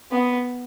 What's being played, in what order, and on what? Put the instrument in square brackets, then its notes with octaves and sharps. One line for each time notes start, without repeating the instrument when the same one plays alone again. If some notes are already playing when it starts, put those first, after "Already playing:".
[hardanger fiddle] B3